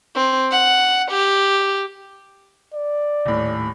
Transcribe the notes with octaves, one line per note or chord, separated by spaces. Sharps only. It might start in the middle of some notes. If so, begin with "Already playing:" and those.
C4
F#5
G4
D5
D#1 A2